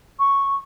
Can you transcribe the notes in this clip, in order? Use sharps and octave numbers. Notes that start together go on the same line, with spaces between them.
C#6